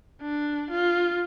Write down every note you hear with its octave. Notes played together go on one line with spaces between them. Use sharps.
D4
F4